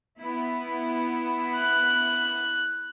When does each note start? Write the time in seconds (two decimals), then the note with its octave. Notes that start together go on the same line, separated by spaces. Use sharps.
0.20 B3 E4
1.57 F#6